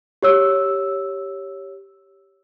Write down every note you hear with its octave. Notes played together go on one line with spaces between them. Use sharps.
G4 C#5 E6